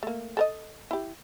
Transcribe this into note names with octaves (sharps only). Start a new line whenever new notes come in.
A3 A#3
A4 A#4 D#5
E4 G4